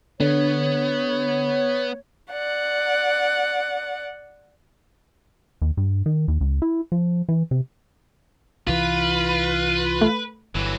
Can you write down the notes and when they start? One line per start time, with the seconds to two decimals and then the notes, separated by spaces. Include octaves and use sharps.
0.20 D3 B3 C#5
2.32 D5 F#5
5.62 D#2
5.77 G2
6.06 D#3
6.28 D#2
6.41 C#2
6.62 E4
6.92 F3
7.29 E3
7.51 C3
8.67 C2 E3 F4 B4
10.01 A3
10.55 G1 E3 F#3